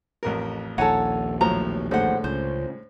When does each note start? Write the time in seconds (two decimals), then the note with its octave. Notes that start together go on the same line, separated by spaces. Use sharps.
0.23 A1 F2 A#4
0.78 A#1 D#2 A4 C#5 F#5 G#5 A#5
1.41 A2 F3 F#3 A#5
1.91 A2 D3 G#3 C5 F#5
2.24 C#2 C5